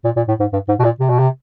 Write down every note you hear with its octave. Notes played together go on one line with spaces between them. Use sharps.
A#2
A#2
A2
G#2
G2
G#2
B2
A#2
C3
B2
C3